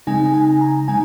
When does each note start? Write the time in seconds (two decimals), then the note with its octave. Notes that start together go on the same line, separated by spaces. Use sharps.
0.07 C#3 G#3 C4 D#4 G#5
0.34 G#5
0.61 A#5
0.88 C#3 G#3 C4 D#4 G#5